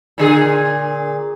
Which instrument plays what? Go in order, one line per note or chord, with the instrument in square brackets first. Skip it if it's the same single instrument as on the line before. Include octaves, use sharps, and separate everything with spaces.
[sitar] A#2 D3 G#4